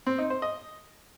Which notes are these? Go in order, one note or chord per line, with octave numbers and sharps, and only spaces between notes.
C4
D#4
C5
D#5